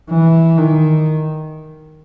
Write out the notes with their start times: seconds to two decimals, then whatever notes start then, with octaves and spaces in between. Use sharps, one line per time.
0.10 E3
0.58 D#3